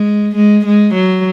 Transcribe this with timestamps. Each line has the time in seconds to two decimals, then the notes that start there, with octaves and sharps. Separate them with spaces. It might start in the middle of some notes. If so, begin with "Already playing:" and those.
Already playing: G#3
0.36 G#3
0.66 G#3
0.95 F#3